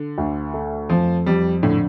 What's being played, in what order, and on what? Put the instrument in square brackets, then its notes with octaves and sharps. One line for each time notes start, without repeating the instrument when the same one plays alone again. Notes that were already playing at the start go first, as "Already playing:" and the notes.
Already playing: [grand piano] D3
[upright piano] D2
A3
[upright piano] F2 [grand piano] F3
[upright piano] F2 [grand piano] G3
[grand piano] A2 [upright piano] D3